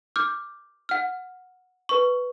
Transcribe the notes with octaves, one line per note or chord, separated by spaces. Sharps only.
D6 F6 G6
F#5 F6
B4 C#6